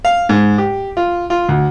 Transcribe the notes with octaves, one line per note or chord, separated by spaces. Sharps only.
F5
G#2
G4
F4
F4
D2